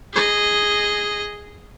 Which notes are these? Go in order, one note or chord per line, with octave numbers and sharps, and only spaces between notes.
G#4 D#5